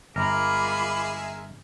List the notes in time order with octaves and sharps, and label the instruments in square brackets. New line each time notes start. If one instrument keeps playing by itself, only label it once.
[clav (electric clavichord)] G1 [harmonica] G#3 G#4 E5 [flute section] F4 B5 D6 [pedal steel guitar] A#4